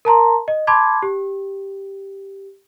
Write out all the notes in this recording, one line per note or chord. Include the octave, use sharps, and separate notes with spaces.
A#4 A5 A#5 C6
D#5
A5 B5 C6 D6 G#6
G4